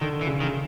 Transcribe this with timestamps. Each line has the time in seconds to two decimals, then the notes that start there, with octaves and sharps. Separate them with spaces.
0.01 D3 D#3
0.21 E3
0.27 C#3
0.41 D#3
0.43 C#3